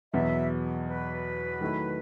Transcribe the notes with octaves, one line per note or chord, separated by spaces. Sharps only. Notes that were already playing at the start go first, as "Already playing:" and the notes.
E2 B2 F#3 B3 E5
B4
D#3 F#3 A3 E4